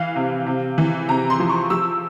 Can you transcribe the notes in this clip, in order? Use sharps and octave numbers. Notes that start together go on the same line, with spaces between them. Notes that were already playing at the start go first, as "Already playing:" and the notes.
Already playing: E3 F5
C3
C3
E3
C3 A#5
C6
F3
C#6
F3 E6